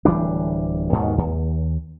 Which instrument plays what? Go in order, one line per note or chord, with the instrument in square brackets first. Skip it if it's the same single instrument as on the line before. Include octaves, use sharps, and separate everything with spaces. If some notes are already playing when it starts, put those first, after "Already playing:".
[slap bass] D1 E3 G3 D4
D#2 G#2 B2 D#3
D#2